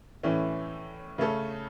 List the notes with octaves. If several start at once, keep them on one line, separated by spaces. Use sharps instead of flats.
A2 E3 A3 C#4
C#3 A3 C#4 A4